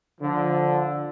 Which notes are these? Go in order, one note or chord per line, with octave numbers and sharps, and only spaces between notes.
D3 F3